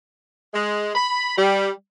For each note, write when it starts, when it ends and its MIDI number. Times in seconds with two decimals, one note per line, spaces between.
0.54 0.93 56
0.95 1.35 83
1.36 1.69 55